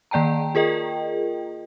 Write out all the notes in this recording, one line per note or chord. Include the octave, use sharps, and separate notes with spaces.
D#3 A#3 D5 G5 A5 A#5
F4 G#4 A#4 D#5 G5